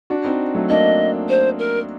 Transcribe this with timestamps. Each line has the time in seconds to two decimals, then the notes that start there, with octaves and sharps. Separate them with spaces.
0.10 D4 F#4
0.25 C4 D#4
0.55 F#3 A3
0.69 A#3 D4 D#5
1.29 C5
1.59 A#4